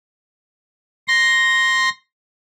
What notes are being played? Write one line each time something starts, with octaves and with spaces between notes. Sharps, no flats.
C6 A#6